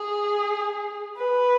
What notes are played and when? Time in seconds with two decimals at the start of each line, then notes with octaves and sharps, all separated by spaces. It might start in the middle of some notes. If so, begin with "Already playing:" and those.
Already playing: G#4
1.17 B4